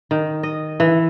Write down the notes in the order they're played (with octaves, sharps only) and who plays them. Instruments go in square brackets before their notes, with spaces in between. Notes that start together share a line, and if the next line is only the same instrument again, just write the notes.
[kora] D#3
D#5
E3